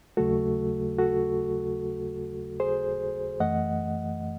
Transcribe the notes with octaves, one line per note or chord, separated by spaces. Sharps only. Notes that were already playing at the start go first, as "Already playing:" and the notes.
D#2 C#3 F#3 A3 F#4 A4
F#4 A4
G#4 C5
F#2 E3 A3 D#5 F#5